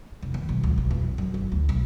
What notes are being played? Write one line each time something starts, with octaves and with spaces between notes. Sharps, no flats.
F1
D#2
B1
C#2
B1
E2
F#2
G1
D2
B1